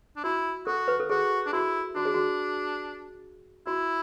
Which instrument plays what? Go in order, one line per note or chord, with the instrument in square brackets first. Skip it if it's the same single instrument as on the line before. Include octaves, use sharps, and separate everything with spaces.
[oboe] D4
[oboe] E4 [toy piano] F#4
[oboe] F#4 [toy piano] A4
[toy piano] B4
A4
[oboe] F#4 [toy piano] G#4
[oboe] D4
[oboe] E4 [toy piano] F#4
[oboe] D4 [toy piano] F#4
[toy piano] G#4
F#4
[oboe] E4 [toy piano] F#4